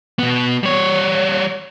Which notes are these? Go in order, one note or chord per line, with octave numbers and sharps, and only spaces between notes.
B2 B3
G3 C#5